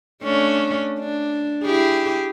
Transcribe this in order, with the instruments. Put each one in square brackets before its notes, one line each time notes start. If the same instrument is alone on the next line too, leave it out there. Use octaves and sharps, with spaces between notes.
[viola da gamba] A3 C#4 D4
D4
E4 G4 G#4